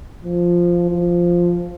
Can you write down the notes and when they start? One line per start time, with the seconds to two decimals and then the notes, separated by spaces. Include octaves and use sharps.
0.25 F3
0.90 F3